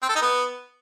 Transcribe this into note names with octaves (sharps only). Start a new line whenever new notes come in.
C4
A4
D#4
B3